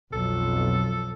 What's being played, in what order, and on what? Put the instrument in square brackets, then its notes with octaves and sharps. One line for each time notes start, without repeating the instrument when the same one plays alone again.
[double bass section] B1 F2 [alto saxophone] A4